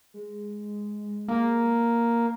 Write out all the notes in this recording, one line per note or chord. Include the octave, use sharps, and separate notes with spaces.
G#3
A#3